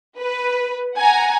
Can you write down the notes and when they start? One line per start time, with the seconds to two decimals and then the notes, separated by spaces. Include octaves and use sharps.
0.18 B4
0.97 F#5 G#5 A#5